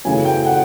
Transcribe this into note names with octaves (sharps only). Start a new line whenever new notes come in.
F#2 C#3 E3 A3 G#5
G5
F#5